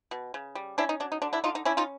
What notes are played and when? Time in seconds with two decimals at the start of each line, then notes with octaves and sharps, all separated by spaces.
0.11 B2
0.34 C#3
0.55 G3
0.78 C#4 D4 E4
0.89 D#4
1.00 F#3 D4
1.12 D#4
1.22 D3 D4
1.33 D4 E4
1.44 D3 D#4 F4
1.55 D#4
1.65 C#4 D4 E4
1.77 D#4 F4